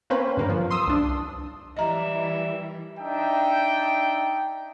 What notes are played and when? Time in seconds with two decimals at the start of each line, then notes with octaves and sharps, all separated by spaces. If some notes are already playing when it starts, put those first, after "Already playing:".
0.10 A#3 C4 C#4 B4 C5
0.37 G2 D3 A#3
0.49 F3
0.70 C6 D#6 E6
0.87 C2 D4
1.77 E3 G3 D#5 E5 A#5
3.00 D4 D#4 E5 G5